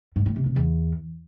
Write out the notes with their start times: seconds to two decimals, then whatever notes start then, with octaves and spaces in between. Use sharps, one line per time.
0.16 G#2
0.26 A2
0.36 C3
0.46 C3
0.56 E2